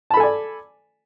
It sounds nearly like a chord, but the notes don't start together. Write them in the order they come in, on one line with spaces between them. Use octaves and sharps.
A5 B5 A4 G#5 D5